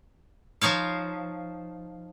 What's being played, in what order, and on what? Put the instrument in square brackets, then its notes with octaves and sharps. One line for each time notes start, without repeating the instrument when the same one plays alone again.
[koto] F3 D#4 C#5 F5